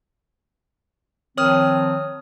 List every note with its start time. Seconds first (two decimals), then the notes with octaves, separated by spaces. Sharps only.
1.38 D#3 F3 C4 C#5 D#6 F6